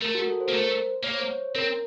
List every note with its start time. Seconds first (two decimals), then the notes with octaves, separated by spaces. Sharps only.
0.02 A3 A#4
0.15 F#4
0.27 A4
0.41 C5
0.48 A#3 A#4
0.53 A3 C5
1.04 A#3 C#5
1.13 C5
1.23 C#5
1.55 C4 A#4